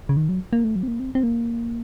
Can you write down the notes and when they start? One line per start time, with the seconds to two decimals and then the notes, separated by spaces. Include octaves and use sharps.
0.09 C#3
0.17 D#3
0.29 F#3
0.53 A#3
0.64 A3
0.76 F#3
0.83 C4
0.88 A#3
1.00 C4
1.15 C4
1.23 A#3